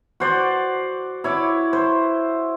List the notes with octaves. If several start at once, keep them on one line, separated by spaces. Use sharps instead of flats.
F#4 C5 D5
E4 C#5 D5
C5